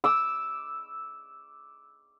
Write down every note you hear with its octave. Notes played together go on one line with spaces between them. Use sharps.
D6 E6